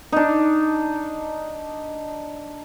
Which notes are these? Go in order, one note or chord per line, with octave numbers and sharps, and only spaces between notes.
D4 D#4